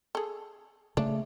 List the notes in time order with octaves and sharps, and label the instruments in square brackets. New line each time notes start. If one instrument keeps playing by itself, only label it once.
[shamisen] G#4 A4
[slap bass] C#3 A3 [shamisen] D4